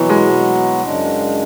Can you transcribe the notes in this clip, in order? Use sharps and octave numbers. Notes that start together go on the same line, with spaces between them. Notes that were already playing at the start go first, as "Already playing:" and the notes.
Already playing: B2 E3 F#3 B3 F#4
G#3
F#2 C#3 G#3 D4